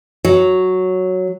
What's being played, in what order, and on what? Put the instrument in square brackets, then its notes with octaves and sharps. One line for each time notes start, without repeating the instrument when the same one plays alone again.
[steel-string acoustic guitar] F#3